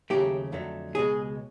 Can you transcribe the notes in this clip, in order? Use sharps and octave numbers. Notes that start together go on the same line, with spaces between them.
D#2 C#3 F#3 A3 G4
F2 D3 F#3 A3
C#2 B2 G#3 G#4